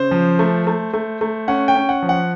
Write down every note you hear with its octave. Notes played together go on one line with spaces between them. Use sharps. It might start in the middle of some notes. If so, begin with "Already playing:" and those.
Already playing: C#3 C5
F3
A3
A3
A3
A3
C#4 F#5
G5
C#4
F#5
F3
F#5